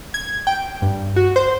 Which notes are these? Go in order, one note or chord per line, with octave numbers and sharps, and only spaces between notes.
G#6
G5
G2
F#4
C5